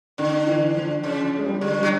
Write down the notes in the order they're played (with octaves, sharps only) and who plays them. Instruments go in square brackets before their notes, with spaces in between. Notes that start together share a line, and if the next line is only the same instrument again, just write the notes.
[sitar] D3 [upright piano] D#3
[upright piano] E3
F3
[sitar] C#3
[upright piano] G#3
G3
[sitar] D3
[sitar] F#3 [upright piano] G3